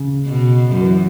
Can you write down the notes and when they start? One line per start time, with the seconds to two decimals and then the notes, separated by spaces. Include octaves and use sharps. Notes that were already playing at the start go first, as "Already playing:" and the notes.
Already playing: C#3
0.26 B2
0.72 F#2 F#3
0.81 E3
0.90 F#3